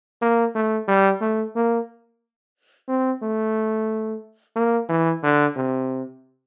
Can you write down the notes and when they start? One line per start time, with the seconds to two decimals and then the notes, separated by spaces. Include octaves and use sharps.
0.22 A#3
0.55 A3
0.88 G3
1.21 A3
1.56 A#3
2.88 C4
3.22 A3
4.56 A#3
4.89 E3
5.23 D3
5.56 C3